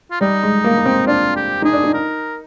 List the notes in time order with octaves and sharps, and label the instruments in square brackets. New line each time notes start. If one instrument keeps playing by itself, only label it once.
[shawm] F4
[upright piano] G3 [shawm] D#4
[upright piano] G#3
A#3
A#3
C4
[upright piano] D4 [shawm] F4
[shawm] G4
[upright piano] D#4 [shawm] G#4
[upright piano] D4
D#4
[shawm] A#4